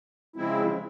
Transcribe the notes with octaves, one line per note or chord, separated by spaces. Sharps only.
C#3 F3 G#3 C4 E4